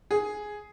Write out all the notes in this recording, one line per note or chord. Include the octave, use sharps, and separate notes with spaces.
G#4